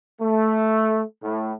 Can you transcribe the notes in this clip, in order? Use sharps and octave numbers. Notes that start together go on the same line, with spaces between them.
A3
A2